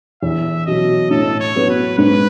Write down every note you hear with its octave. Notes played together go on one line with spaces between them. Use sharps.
E2 E5
B2 F#3 D#5
A2 A4
C#5
F#3 B3 F#4
B4
G#2 B4